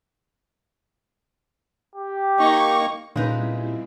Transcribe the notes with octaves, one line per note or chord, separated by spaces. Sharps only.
G4
A#3 D#4 C#6
A#2 C#3 G3 G#3 C4 D#4 E4 B4